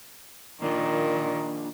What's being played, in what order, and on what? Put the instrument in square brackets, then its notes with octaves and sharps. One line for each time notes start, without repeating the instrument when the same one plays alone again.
[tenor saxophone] A#2 [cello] D#3 [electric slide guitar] A#3 D4 F4